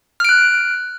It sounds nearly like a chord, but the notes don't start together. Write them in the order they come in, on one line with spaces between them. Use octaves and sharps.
F6 D7 F#6